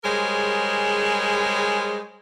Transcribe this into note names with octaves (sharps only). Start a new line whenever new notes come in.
G3 G#3 G#4 A#4 C5 C#5